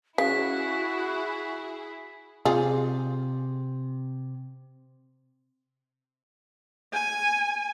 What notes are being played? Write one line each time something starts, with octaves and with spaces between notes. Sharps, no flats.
C#3 E4 F#4 G#4 B6
C3 F4 G#4
G#5